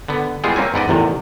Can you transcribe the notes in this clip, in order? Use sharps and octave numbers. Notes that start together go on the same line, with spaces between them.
D3 B3
G3 G#3 B3 E4 F4 G#4
A#3 C4 C#4 G#5
G#2 B3 D5 D#5
A1 E2 C3 D#3